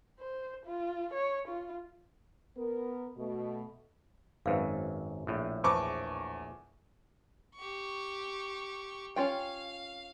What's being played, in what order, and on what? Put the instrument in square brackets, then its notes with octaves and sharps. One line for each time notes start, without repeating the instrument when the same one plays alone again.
[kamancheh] C5
F4
C#5
F4
[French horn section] B3 A#4
B2 A3
[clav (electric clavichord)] G#1 F#2 [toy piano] B4 C5 F5
[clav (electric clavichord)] A#1 A2
[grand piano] E2 C#6 D6 [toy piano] B4 C5 A5
[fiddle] G4 C#6
[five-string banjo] C#4 F4 G5 [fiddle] F5